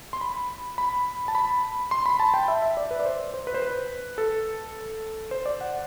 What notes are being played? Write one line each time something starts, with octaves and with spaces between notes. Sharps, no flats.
C6
B5
B5
A5
B5
C6
B5
A5
G5
E5
E5
D5
B4
D5
C5
C5
B4
C5
B4
A4
C5
D5
F#5